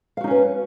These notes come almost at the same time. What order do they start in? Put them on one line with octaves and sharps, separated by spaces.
F5 F#4 D#4 C#4 B4